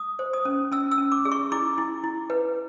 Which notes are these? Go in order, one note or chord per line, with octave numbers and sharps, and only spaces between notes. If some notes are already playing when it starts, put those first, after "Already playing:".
Already playing: D#6
C5
D#6
C#4
C#4 E6
E6
C#4
D6
G#4
C#6
E4 D6
E4
E4
B4